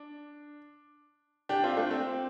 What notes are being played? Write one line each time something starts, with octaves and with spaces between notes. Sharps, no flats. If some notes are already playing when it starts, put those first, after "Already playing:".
Already playing: D4
D4 G4
C4 F4
A3 D4
C4